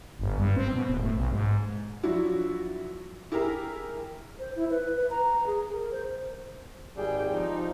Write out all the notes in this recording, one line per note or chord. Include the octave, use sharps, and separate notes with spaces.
G1
G2
C4
B2
D1
A2
B1
G#2
F3 F#3 D4 E4 F#4
E4 G4 G#4 A#4
C5
E4
B4
B4
A#5
G#4
A#4
C5
G#1 G3 G#4 G5
F3 D#4